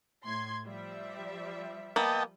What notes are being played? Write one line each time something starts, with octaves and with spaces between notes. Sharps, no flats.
A2 C6 G#6
F3 G3 E5
A#3 B3 D#5 G5 A5